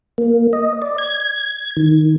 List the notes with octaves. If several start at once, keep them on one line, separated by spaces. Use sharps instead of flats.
A#3
D#5
D5
G#6
D#3